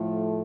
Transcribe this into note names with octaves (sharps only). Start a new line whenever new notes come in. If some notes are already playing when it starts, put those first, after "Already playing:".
Already playing: A2 F3 A3